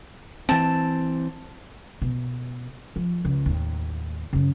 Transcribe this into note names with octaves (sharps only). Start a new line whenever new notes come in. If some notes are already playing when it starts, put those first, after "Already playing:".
E3 C4 A5
B2
F3
C#2
D#2 A2
F#2 C#3